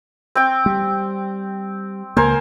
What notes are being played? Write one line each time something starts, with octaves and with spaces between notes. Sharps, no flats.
C4 G5
G3
C#2 A#3 A#4 C5 G#5